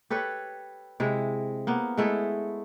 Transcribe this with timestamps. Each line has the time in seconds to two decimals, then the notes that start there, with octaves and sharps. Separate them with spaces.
0.10 G4 A4 B4 C#5
1.00 C3 G#3 E4
1.67 A#3 B3
1.97 G#3 A3 E4 A4